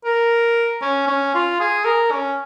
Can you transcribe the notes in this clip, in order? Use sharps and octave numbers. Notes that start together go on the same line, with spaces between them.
A#4
C#4
C#4
F4
G#4
A#4
C#4